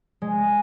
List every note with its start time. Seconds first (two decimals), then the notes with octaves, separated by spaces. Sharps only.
0.22 G#3